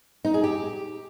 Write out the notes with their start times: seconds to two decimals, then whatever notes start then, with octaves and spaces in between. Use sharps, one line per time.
0.25 D#4
0.34 G#4
0.44 G4